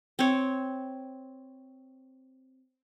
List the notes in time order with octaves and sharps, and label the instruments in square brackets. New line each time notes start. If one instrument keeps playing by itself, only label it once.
[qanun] C4 C#5